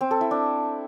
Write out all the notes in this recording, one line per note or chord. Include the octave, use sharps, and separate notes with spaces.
C4
A4
E4
D4